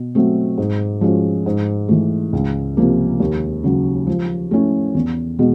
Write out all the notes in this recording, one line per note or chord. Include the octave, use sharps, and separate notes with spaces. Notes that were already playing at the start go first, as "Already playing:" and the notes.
Already playing: B2
F#3 A3 C4
G#2
F3 G#3 C#4 F#4
G#2
E3 A3
C#2
C3 F3 A#3
D#2
C#3 F#3
F3
A3 C#4 E4
E2
B2 G#3